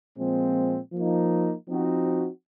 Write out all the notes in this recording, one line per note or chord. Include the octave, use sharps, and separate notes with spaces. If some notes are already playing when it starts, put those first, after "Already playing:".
A#2 F3 G#3 C4
F3 A#3 D#4
F3 C4 D#4 F#4